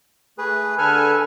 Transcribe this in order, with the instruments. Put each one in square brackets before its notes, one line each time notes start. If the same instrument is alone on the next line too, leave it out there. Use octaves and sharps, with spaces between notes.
[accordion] A3 [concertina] G#4 B4
[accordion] D3 G#5 F6 [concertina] A4 B4